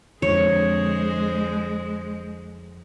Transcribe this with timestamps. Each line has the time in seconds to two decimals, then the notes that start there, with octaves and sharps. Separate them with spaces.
0.22 F2 D3 G#3 G#4 C5 C#5